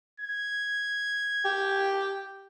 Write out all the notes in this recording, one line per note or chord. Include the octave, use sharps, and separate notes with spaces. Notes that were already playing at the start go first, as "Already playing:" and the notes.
G#6
G4